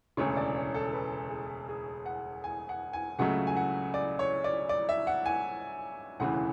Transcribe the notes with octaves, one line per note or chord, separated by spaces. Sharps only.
E1 D2 C#3 C#5
D5
C#5
A4
B4
G#4
G#4
F#5
G#5
F#5
G#5
C#2 C#3 F#3 A3 F#5
G#5
F#5
D5
C#5
D5
D5
E5
F#5
G#5
E1 D2 C#3 E3 F#5